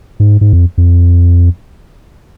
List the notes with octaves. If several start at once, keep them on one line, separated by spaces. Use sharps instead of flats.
G#2
G#2
F2
F2